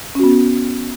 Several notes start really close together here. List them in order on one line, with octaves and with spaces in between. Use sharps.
C#4 F#4 B3